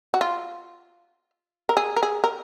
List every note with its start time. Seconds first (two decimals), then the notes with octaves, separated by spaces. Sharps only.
0.14 F#4
0.21 F4
1.69 A#4
1.77 G#4
1.96 A#4
2.03 G#4
2.24 A#4